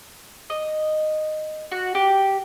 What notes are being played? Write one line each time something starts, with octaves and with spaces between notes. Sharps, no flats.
D#5
F#4
G4